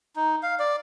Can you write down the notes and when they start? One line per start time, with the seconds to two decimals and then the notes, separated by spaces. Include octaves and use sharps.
0.16 D#4
0.43 F5
0.59 D5